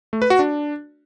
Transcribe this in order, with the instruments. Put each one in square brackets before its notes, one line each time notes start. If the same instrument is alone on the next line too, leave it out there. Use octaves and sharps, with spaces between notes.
[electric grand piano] A3
B4
F#4
D4